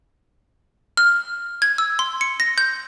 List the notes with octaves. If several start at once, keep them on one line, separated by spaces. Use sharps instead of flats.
F6
G#6
E6
C6
C#7
A#6
G6